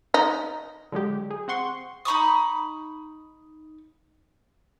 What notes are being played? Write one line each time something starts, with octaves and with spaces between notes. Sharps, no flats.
D#4
D3 F#3 G#3 G4
G#4
C4 F#5 C6 C#6
D#4 B5 C#6 D#6